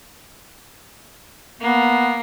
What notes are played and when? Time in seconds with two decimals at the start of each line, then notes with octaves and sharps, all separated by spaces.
1.61 A#3 B3